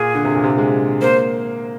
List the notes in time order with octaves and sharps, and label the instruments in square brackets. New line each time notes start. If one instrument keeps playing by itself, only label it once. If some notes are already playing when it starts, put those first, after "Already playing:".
Already playing: [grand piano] A#2 [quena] G#4
[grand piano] D3
C3
A#2
C3
G#3
[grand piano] A#3 [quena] C5